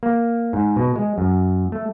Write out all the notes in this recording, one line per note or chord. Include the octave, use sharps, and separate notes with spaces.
A#3
G#2
B2
G#3
F#2
A3